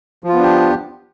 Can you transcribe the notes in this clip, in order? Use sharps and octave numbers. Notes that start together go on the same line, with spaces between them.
F3 B3 D4 F4 G4